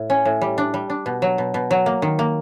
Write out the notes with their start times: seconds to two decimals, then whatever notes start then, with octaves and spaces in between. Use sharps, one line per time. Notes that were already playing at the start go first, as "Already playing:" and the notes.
Already playing: A2
0.10 C#4
0.25 A2
0.41 G3
0.58 D4
0.74 G3
0.90 D4
1.06 B2
1.22 F#3
1.38 B2
1.54 B2
1.71 F#3
1.86 A#3
2.02 D#3
2.19 A#3